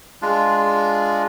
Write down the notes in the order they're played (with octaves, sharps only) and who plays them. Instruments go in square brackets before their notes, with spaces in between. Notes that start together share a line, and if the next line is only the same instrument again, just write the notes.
[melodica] G#3 D4 F4